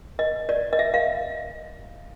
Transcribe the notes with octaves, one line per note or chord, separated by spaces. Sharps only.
D#5
D5
D#5
E5
F5